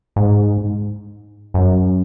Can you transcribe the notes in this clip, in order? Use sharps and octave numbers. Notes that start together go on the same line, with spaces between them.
G#2
F#2